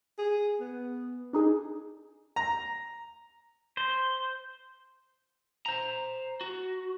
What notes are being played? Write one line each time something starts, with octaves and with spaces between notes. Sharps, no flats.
G#4
B3
D4 D#4 G#4
A#5
C5
C5 A#5
F#4